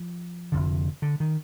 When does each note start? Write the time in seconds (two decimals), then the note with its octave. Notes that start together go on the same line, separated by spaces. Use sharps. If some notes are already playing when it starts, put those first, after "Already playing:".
Already playing: F3
0.52 F1 F2 D3
1.02 D3
1.20 D#3